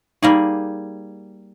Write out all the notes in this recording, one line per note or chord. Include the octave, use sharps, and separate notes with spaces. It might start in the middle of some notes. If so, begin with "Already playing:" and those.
G3 A#3 D#4 G#4